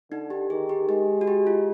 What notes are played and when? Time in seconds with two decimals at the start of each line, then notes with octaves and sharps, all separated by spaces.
0.11 D3 D#4
0.30 G4
0.50 D#3 G#4
0.69 G4
0.89 G#3 G4
1.21 F#4
1.27 G4
1.47 F4